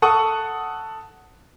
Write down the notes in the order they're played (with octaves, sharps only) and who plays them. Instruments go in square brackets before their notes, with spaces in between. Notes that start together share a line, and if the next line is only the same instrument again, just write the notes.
[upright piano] A4 F#5 C#6 D#6